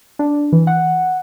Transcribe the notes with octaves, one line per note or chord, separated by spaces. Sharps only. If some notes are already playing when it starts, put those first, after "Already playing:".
D4
E3
F#5